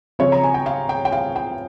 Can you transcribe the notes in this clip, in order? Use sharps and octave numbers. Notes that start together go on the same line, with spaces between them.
C#3 F3 C4 F4 C#5
A#5
G#5
G5
F5
G5
G5
F5
G5